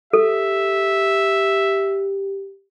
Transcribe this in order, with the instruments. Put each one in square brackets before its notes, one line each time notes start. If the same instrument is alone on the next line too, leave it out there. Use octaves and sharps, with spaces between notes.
[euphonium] G4 [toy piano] A4 [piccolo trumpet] E5